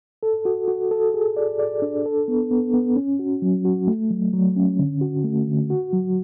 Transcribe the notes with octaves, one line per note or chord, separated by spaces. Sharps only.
A4
F#4
F#4
A4
G#4
D5
D5
D4
A4
B3
B3
B3
C#4
F#4
F#3
F#4
A3
F#3
F#3
C#4
D3
F#4
A3
D3
F#4
F#3